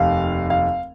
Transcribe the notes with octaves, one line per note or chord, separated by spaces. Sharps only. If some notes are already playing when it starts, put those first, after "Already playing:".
Already playing: F1 D#2 F5
F5